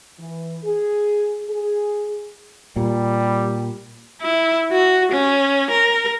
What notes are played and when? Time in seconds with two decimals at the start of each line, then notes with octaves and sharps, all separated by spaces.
0.19 E3
0.64 G#4
1.49 G#4
2.76 A#2 G3
4.21 E4
4.72 F#4
5.11 C#4
5.70 A#4